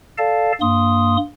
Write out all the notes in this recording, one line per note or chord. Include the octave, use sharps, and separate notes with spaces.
A4 D5 F5 A5
G2 A#3 C6 D#6